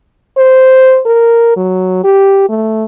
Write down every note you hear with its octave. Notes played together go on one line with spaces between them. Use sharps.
C5
A#4
F#3
G4
A3